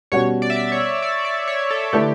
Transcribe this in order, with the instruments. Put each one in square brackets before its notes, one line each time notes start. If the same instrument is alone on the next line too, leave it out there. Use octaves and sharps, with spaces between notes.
[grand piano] B2 G3 C#4 F#4 [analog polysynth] C#5
[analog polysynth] D5
E5
D5
C#5
D5
D5
C#5
A4
[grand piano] D3 A3 E4 B4 [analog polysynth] G4